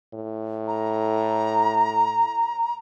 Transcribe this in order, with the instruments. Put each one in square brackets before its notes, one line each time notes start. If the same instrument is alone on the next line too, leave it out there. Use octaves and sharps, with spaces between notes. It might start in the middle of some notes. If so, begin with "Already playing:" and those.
[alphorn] A2
[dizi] A#5